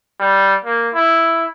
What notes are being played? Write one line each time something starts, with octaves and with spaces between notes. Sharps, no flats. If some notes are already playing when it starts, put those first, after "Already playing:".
G3
A#3
E4